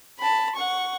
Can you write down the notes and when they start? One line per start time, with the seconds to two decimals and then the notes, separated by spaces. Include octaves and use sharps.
0.19 A5 B5
0.55 F#5 C#6